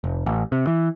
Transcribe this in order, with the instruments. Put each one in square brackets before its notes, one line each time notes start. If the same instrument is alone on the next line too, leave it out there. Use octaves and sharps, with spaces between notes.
[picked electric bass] F1
A1
C3
E3